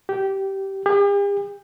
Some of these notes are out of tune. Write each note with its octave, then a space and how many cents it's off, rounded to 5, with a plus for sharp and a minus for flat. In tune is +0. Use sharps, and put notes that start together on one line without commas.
G4 -15
G4 +45